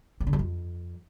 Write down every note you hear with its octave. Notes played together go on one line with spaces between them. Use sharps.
E3
D3
F#2
F2